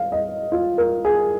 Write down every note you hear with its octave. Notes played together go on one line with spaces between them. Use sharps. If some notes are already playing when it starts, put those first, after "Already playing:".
Already playing: F5
D#5
F4
A#4
G#4